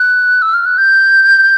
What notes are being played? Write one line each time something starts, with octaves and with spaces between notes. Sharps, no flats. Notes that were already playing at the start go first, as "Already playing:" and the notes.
Already playing: F#6
E6
F6
F#6
G6